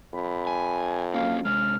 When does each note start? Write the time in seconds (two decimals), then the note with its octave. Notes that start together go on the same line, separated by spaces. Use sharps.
0.14 F2 B5
0.47 G#5
1.14 F#3 A#3 C#4 F5
1.45 C3 G#3 F6